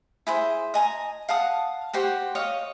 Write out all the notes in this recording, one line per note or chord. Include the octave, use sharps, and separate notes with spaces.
E4 G#4 C5
D#5 G#5 A#5
F5 F#5 A5 D#6
F#4 G4 C5 C#6
C#5 D#5 F5